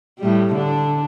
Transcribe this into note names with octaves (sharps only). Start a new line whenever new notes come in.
A2 G3
D3 D4